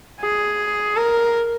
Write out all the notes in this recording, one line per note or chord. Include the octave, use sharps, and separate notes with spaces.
G#4
A#4